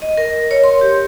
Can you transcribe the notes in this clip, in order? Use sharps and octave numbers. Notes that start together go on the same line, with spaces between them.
D#5
A#4
C#5
C6
G4